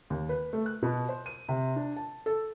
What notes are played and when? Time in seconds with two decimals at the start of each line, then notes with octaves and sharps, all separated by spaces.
0.10 D#2
0.29 B4
0.53 A3
0.66 F#6
0.83 B2
1.09 C5
1.26 D#7
1.49 C3
1.76 D4
1.96 A5
2.26 A4